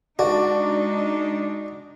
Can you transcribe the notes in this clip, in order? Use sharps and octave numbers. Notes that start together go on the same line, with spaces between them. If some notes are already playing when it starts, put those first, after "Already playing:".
G#3 D4 D#4 F#4 D5 A5